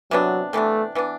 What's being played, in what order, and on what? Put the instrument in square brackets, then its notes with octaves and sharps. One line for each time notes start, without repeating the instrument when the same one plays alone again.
[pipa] C3 E3 B3 D4 [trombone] F#3
[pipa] C3 E3 B3 D4 [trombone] A3
[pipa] E3 B3 D4